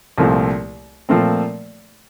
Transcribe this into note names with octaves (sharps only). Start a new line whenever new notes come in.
C2 A#2 F3 A3 C4
A#2 F3 A3 C4